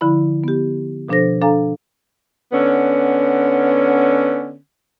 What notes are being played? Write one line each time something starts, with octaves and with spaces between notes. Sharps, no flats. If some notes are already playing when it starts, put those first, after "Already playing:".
D3 F3 E4 B5
B3 G4
B2 F3 D4 A4 C5 A#6
D4 A4 F5 G#5 A#5
D3 B3 C#4